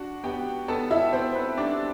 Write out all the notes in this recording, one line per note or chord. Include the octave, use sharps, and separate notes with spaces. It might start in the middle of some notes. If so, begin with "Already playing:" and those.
Already playing: D4 F#4 F#5
B3 G4 G5
B3 A4 A5
E4 E5
B3 C4 C5
B4
G3 D4 D5